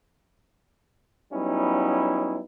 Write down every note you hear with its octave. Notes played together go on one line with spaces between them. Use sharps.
F#3 G3 B3 C#4 D#4 E4